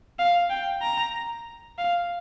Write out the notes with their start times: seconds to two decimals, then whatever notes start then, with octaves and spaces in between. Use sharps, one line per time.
0.19 F5
0.50 G5
0.82 A#5
1.78 F5